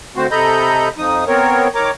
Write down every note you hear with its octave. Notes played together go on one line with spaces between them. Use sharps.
D3 A3 C4 F#4 C5
C3 A4 D#5 A#5 B5 G6
F2 F3 D#4 D#6
B3 C4 A#4 C#5
D#3 A#4 C#5 A#5 D6